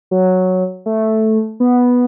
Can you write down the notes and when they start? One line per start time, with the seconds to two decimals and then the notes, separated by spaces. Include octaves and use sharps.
0.11 F#3
0.86 A3
1.60 B3